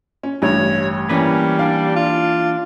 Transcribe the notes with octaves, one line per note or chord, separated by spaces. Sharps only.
C#4
A1 G2 C#5
E3 G3 A#3 C#4 B4
D4 F5
F4